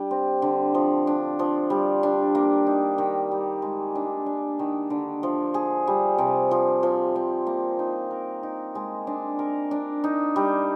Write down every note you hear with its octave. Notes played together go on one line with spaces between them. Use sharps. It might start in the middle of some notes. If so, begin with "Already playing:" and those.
Already playing: G3 D4
C4
D3
F3
D4
F3
G3
D4
A#3
D#4
D#3
G3
G#3
D4
D4
D#3
D3
F3
G#4
G3
C3
F3
F3
C4
A#3
D#4
A#4
D#4
G#3
D4
A#4
D4
D#4
G3